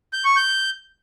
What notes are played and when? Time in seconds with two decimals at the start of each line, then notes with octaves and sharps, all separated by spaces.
0.13 G6
0.25 C#6
0.36 G6